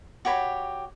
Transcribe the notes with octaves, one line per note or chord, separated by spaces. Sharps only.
F#4 G4 C#5 B5